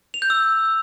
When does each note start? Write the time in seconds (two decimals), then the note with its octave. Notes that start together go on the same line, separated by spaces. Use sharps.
0.14 F7
0.22 G6
0.30 E6